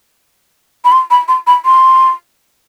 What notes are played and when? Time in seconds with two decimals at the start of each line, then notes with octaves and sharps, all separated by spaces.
0.85 B5
0.92 C6
1.11 B5
1.28 C6
1.47 B5
1.65 C6